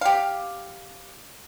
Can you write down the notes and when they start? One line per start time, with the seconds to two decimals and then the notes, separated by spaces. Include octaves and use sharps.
0.01 G4 F5